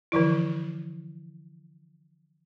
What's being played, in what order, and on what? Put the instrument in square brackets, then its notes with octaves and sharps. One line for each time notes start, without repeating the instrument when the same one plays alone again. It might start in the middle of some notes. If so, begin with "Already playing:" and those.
[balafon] D3 E3 F3 E4